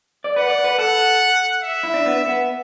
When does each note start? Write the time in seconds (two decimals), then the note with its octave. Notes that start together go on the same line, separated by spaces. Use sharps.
0.24 D5
0.36 B4 F#5
0.50 D5
0.64 B4
0.78 A4 F#5
1.63 E5
1.83 E4
1.94 D4
2.06 B3
2.26 B3